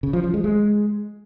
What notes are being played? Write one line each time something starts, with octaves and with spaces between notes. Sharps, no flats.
C#3
F3
F3
G#3
G#3